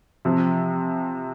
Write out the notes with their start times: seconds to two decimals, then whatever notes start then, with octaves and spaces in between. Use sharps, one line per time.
0.25 C3 F3 C4